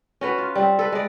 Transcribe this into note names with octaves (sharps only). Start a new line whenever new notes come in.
C#4 F#4 B4
F4
G3 C4
A4 B4
G#3 D5